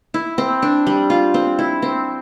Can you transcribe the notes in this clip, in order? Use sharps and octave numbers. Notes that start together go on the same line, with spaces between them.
E4
C4
D4
G3
F4
C4
E4
C4